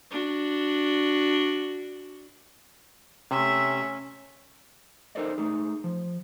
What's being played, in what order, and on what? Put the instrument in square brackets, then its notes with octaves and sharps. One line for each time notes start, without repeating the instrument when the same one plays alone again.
[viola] D4 F#4
[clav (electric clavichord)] C3 [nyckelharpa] A3 E5 [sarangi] C#4
[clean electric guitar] D#4 A4 A#4 C5 D5 D#5
A3 D#4 G#4
F3